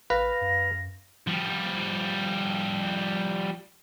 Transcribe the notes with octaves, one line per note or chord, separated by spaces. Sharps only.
A1 B4 F5 A#6
F#2
F3 G3